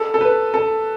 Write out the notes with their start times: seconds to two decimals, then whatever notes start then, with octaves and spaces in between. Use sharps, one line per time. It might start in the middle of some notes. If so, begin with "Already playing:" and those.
Already playing: A4
0.14 A4
0.21 B4
0.54 A4